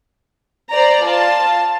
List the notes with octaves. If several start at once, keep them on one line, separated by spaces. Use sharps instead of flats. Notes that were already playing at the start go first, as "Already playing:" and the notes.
C5 D5 A#5
F4 A5